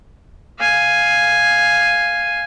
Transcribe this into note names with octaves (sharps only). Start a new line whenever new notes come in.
F5 G#5